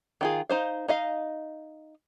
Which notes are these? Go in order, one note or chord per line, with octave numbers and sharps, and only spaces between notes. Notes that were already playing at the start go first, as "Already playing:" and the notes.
D#3 F4 G#4
D#4 C5 F5
D#4 D#5 F5